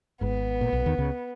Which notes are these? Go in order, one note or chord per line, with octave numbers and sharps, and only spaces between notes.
G#1 G#2 B3
A#2
B1 B2
D#2 D#3
C#2 C#3